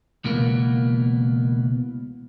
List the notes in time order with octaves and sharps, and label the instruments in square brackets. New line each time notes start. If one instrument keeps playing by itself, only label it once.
[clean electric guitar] C#2 B2 E3 A#3 B3